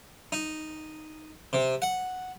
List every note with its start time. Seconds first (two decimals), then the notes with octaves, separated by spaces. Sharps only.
0.32 D#4
1.53 C3
1.82 F#5